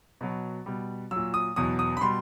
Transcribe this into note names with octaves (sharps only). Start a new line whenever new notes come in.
B2 F#3
B2 G3
A#2 F#3 E6
D#6
E2 B2 F#3 D#6
D#6
B5
B2 G3 C6